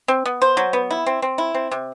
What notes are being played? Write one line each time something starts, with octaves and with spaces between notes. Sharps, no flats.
C4
B3
C5
F#3
B3
E4
C4
C4
E4
C4
C3